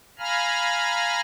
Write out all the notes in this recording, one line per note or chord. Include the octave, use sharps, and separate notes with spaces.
F5 G#5 A#5 B5 F6